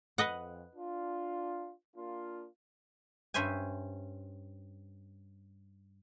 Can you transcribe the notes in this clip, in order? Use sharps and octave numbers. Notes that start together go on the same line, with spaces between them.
F2 B4 D#5 F#5
D4 F4
A#3 D4 F4
G2 C#4 C5 E5 G#5